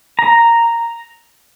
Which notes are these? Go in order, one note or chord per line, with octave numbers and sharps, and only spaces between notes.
A#5